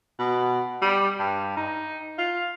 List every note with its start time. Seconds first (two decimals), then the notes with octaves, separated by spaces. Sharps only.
0.19 B2
0.82 G3
1.19 G2
1.57 D#4
2.18 F4